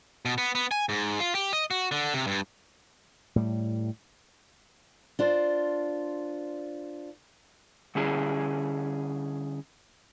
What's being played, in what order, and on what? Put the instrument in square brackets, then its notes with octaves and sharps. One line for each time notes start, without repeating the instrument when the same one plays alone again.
[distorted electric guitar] B2
B3
B3
G#5
G#2
F4
G4
D#5
F#4
D3
C3
G2
[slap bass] A2 G3
[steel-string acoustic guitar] D4 F4 C5
[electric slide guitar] D3 G3 C#4 E4 G#4